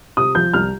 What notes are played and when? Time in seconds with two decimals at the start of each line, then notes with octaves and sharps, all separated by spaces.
0.17 C3 D#6
0.35 F3 G6
0.54 C2 F6